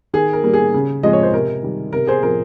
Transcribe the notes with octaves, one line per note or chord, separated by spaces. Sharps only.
D#3 G#4
A#4
G3 A#3
G#4
C#3
F3 G#3 C4 D#5
C#5
C5
C3 A#4
D#3 G3
C3 A#4
G#4 C5
F3 C4 A#4